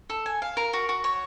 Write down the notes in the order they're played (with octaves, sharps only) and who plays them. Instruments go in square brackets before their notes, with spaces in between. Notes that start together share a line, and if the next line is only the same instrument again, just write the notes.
[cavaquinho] A4
G#5
F5
A#4
F#4
F#4
C#5